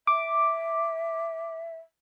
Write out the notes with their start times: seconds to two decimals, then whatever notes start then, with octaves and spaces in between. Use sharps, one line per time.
0.07 E5 D6